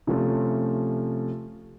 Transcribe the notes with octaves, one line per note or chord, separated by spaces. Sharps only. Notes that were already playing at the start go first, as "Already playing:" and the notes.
C3 F3 A3 C#4